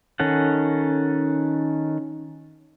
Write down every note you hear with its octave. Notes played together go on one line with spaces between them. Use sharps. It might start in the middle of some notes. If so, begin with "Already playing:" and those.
D#3 C#4 A4 F#5